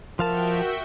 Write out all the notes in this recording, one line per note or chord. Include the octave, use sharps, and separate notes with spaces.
F3 F#4 A#4 E5 F5 G5 A5